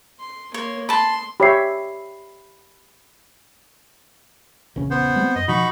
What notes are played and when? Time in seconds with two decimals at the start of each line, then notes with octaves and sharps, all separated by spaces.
0.19 C6
0.54 A#3 C#5 C6
0.89 A5 B5 C6
1.40 G4 C#5 E5 B5 C7
4.76 A#1 E2 C#3
4.90 B3 C5
5.16 G3 A3 C4
5.35 F#2 D#5
5.48 B2 F3 D#4 F#4 B5